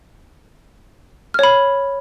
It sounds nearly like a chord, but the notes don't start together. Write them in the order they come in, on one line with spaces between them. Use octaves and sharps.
F6 C#5 B5